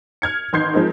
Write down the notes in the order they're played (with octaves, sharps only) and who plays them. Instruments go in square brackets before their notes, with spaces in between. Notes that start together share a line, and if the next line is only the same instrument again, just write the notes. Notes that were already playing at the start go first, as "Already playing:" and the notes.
[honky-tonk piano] F6 G#6 C#7
A1 D#3 C6 G6 G#6 C7
F3 G#3 C4 D#4 A#4